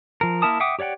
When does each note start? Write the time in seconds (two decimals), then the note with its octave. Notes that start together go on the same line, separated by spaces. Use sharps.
0.21 F3 A#4
0.42 A#3 E4 A#4 A5 D#6
0.60 E5 F#5 G5 D6 D#6
0.79 G4 C#5 D5 F#5 G5